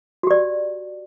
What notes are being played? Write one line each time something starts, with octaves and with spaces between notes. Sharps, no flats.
F#4 G4 D5